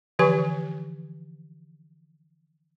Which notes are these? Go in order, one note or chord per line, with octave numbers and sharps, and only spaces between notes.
D3 E3 F3 G4 B4 G#5